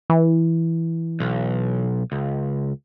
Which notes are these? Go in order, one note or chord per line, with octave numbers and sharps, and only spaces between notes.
E3
B1
C#2